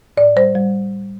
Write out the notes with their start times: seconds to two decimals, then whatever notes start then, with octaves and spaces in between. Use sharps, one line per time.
0.17 A2 D5
0.36 G3 C5
0.55 G3